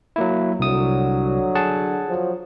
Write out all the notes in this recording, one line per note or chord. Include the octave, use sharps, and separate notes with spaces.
F#3 A#3 E4
C2 D3 F#3 D#6
G#4 F#5 A5
F3 F#3